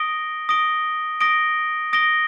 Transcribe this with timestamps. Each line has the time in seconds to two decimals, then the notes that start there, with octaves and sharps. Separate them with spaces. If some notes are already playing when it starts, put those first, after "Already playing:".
Already playing: D#6 A#6 D7 G7
0.49 D#6 A#6 D7 G7
1.21 D#6 A#6 D7 G7
1.93 D#6 A#6 D7 G7